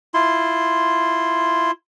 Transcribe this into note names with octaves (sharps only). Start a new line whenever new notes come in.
E4 F4 C6